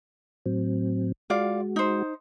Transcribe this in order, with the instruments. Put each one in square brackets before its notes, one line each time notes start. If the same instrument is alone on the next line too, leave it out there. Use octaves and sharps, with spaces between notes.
[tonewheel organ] A2 F#3 C4
[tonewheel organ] G#3 F#4 [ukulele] F4 D5 F5
[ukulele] D#4 C5